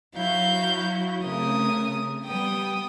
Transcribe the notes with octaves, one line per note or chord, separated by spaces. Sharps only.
F#3 E4 F#4 F5 G6
C#3 A3 C4 A#4 D#6
G3 B3 G5 D#6